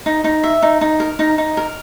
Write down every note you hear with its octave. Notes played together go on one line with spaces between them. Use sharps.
D#4
D#4
E5
D#4
D#4
A#4
D#4
D#4
A#4